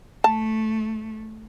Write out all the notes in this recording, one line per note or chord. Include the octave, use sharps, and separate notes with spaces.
A3 A5